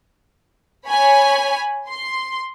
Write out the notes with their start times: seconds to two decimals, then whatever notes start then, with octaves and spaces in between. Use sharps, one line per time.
0.86 C#5 G#5 B5
1.89 C6